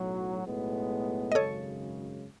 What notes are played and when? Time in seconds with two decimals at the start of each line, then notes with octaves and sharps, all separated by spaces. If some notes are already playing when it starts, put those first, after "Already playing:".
Already playing: B1 A2 F#3
0.43 B1 A2 G#3 B3
1.32 D#5
1.35 G#1 F#2 C#3 G#3 A4 C#5